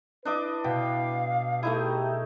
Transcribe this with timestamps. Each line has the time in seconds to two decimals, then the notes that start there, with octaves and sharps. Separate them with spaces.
0.25 D4 E4 B4 D#5 D6
0.64 B2 F5 G5
1.63 A3 D#4 E4 G4 G#4